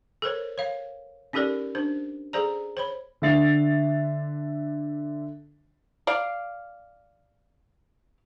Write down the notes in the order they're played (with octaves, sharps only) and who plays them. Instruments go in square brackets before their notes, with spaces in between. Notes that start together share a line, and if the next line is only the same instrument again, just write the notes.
[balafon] A4 A#4 C5 C#5
C#5 F5
C#4 D#4 G4 A4 A#4 D5
D4 C5
G#4 A4 C5 D5 A#5
C5 C#5 B5
[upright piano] D3 D4 E5 A6 C7 F7
[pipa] D5 F5